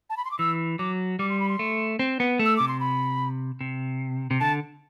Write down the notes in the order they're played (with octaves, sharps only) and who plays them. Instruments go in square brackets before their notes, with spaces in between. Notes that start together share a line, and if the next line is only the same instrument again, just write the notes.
[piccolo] A5
B5
C6
D6
[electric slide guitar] E3 [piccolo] E6
[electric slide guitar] F#3 [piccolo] D6
[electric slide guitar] G3 [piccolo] D6
[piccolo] C6
B5
C6
[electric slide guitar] A3
C4
B3
A3
[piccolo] E6
[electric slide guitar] C3 [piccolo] D6
[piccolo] C6
B5
[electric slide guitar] C3
C3
[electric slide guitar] D3 [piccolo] A5